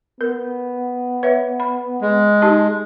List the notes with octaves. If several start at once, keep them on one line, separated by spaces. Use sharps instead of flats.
B3 A#4
B4 C#5 E5
B5
G#3
D#4 G4 A5